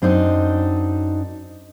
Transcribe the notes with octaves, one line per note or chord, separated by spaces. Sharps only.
F#2 C4 D4 D#4